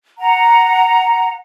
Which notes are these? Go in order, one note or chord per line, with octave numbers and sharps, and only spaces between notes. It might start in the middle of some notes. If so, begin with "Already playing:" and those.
F#5 A#5